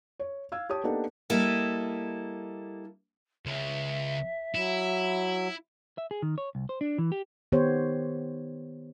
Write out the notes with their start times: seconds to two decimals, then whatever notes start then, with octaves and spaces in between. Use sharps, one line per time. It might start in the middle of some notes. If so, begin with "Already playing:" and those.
0.19 C#5
0.52 F5 E6 G#6
0.70 G4 C#5 A5 D#6
0.84 A#3 B3 D4 D#4 G4 A4
1.30 G3 A#3 E4 A4 D#5
3.46 C#2 C#3 E5
4.55 F#3 E4
5.98 E5
6.11 G#4
6.22 D#3
6.38 C#5
6.55 C2
6.69 C5
6.81 D4
6.98 E3
7.12 G4
7.52 D#3 B3 G4 C5 C#5